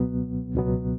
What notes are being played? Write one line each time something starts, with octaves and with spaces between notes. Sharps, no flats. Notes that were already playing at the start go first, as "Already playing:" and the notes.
Already playing: C#2 B2 F#3 B3
C#2 B2 F#3 B3